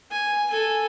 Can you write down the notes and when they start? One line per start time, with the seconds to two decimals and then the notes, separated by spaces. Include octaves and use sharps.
0.11 G#5
0.51 A4 G#5